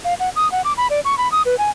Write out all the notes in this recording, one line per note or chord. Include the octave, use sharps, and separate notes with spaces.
F5
F#5
D#6
F#5
D6
B5
D5
C#6
B5
D#6
B4
G#5